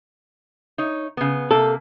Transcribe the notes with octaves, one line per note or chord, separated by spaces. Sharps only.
D#4 C#5
C#3 B3
C3 A#3 A4